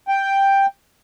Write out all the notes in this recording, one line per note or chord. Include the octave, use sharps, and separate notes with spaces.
G5